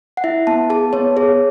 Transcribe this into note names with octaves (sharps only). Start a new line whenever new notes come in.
F#5
E4 E5
B3 A5
G#4 A5
B3 C#5
G#4 C#5